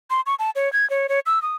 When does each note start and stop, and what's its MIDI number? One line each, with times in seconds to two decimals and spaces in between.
0.10 0.21 84
0.26 0.35 85
0.39 0.50 81
0.56 0.71 73
0.73 0.88 92
0.90 1.07 73
1.09 1.20 73
1.26 1.42 88
1.42 1.56 87